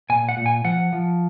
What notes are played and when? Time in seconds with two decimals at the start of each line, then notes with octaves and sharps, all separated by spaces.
0.10 A#2 G#5
0.29 F#5
0.37 A#2
0.46 G#5
0.64 F3 F#5
0.93 F3